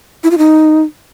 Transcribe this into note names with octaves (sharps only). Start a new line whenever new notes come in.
E4
F4
D#4